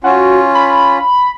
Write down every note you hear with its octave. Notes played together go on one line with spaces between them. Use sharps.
C#4 F4 F#4
B5